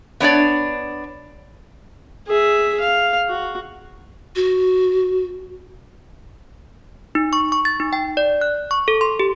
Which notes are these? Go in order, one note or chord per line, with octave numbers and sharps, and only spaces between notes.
B3 D4 C#5 D5
G#4 E5
F5
F#4
F#4
D#4
C#6
C#6
A6
D#4
G5
D5
F#6
C#6
A4
C6
G4